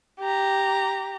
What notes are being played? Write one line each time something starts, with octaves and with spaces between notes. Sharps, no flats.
G4 A#5